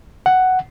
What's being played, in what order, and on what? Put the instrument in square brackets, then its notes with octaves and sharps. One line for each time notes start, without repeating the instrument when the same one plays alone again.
[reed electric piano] F#5